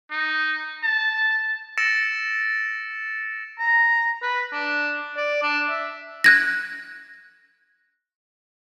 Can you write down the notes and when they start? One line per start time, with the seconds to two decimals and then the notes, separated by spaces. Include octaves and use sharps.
0.11 D#4
0.83 A5
1.78 E6 A6 A#6 C#7 D7 E7
3.59 A#5
4.23 B4
4.53 D4
5.17 D5
5.43 D4
5.70 E5
6.24 F#6 G#6 A#6